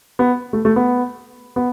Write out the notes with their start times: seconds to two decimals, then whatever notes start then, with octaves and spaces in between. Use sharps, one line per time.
0.19 B3
0.53 A3
0.65 A3
0.76 B3
1.56 B3